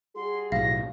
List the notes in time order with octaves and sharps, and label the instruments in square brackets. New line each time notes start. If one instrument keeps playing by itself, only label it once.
[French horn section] G3 F#4 G#4 [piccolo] C6
[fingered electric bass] B1 A2 [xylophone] F5 [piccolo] A#6